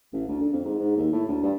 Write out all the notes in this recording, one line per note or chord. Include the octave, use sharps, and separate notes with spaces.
A1
D2
D3
F2
G#2
G#2
D#2
A2
D2
G2